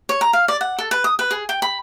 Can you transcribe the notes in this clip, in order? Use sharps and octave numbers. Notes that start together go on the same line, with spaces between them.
C#5
A#5
F5
D5
F#5
A4
B4
D#6
B4
G#4
G5
B5